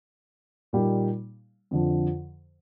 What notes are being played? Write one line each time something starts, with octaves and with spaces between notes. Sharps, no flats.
A#2 G3 A#3 D#4
F2 D3 F3